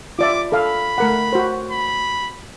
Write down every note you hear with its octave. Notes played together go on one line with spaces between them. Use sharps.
F4 D5 E5 D6
A4 F5 B5
A3 A#4 F#5
F#4 C5
B5